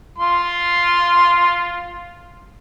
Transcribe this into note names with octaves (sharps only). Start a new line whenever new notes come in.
F4 C6